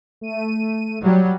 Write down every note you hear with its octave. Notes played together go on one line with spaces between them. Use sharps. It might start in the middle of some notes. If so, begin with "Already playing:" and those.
A3 D#7
F#3 G3